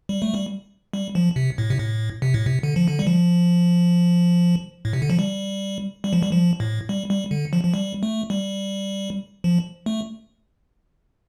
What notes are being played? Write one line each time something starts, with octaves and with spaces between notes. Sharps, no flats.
G3
A3
G3
G3
F3
C3
A2
C3
A2
C3
A2
C3
D3
F3
D3
G3
F3
A2
C3
D3
F3
G3
G3
F3
G3
F3
A2
G3
G3
D3
F3
F3
G3
A3
G3
F3
A3